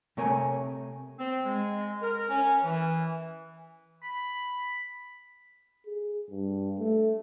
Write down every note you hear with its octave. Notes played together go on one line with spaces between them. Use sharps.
C3 A3 A#4 C#5 G#5
C4
G#3
A#4
C#4
E3
B5
G#4
G2
A3